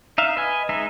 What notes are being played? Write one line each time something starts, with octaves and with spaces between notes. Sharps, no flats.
D#4 E5 F5
B4 D#5 G#5
G#3 D#4 E5